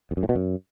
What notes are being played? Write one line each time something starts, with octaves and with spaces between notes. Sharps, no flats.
E2
F#2
A2
B2
F#2